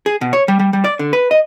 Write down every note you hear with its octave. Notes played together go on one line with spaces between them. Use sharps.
G#4
B2
C#5
G3
G3
G3
D5
D3
B4
D#5